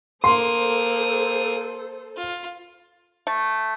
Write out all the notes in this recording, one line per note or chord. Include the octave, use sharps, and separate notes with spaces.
A#3 A4 C5 C6 D#6
F4
A3